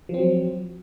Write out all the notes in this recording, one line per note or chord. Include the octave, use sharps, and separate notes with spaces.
F3 F#3 C4